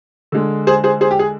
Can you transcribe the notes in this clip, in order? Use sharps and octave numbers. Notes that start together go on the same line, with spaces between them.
D3 G#3
G#4 C5
G#4 C5
G#4 C5
G4
G#4